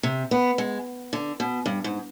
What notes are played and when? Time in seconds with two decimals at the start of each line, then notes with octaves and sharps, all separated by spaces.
0.03 C3
0.31 B3
0.58 G#3
1.13 D3
1.40 B2
1.66 G2
1.84 G#2